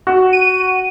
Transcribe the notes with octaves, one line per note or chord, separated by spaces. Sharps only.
F#4
D#7